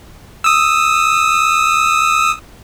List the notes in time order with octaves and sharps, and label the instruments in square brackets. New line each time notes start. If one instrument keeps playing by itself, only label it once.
[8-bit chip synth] D#6 E6